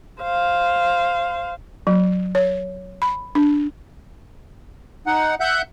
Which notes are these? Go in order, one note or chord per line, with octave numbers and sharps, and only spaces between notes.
C5 F5
F#3
C#5
B5
D4
D#4 F#5
E5 F#5 F#6 G6